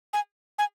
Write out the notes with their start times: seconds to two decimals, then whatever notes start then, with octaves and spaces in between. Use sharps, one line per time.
0.13 G#5
0.58 G#5